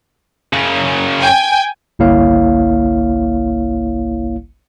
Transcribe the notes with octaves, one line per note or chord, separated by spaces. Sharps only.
F#2 C#3
G5 G#5
G1 C2 A#3 E4 C#5 F5